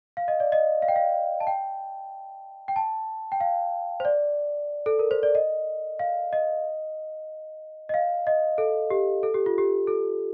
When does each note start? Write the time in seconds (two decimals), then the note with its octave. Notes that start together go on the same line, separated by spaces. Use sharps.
0.17 F5
0.28 D#5
0.40 D5
0.52 D#5
0.82 F5
0.88 G5
0.96 F5
1.40 A5
1.47 G5
2.68 G5
2.76 A5
3.32 G5
3.41 F5
4.00 C5
4.05 D5
4.86 A4
4.99 A#4
5.11 C5
5.23 D5
5.35 D#5
5.99 F5
6.33 D#5
7.89 D#5
7.94 F5
8.27 D#5
8.58 A4
8.90 G4
9.23 A4
9.34 G4
9.46 F4
9.58 G4
9.87 A4